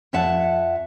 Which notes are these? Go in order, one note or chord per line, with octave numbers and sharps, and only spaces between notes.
F2 C#5 E5 F#5 A5